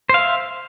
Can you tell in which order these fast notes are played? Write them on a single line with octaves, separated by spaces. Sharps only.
C5 F5 E5